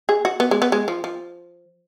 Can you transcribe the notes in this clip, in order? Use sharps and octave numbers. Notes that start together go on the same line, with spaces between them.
G#4
F#4
B3
G#3
B3
G#3
F3
F3